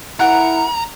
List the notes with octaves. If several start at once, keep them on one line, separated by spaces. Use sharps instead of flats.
E4 A#4 F#5 A#5